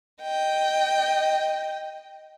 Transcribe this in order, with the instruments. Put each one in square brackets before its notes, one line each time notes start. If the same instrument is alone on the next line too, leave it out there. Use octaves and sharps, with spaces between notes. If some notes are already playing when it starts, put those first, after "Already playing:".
[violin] D#5 G5